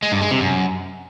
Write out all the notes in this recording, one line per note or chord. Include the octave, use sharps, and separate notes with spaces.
G#3
G2
G#3
C3
F#2